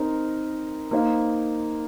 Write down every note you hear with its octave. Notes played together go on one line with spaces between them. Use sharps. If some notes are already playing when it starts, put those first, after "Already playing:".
Already playing: C4 D#4 A#4
A#3 D#4 C5 F5